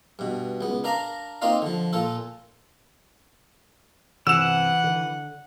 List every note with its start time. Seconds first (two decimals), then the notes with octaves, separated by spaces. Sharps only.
0.19 G2 B2
0.61 C#2 B3
0.84 D4 A#4 F5 A#5
1.42 A#3 C4 D#4 F4 D5 F5
1.62 D3 F3
1.93 A#2 F4 A4
4.27 G1 C3 E3 F#5 E6 E7
4.84 D3